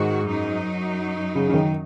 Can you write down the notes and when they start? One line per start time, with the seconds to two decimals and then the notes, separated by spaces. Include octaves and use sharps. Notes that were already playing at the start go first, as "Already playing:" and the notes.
Already playing: G#2 D#3 G#3 F#4
0.25 F#2 F#3 D#4
1.35 C#3
1.49 C#3
1.54 D#3